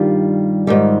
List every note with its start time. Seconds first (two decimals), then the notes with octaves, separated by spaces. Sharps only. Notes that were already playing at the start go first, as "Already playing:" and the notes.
Already playing: G2 D#3 G3 F4
0.67 G#2 D#3 G3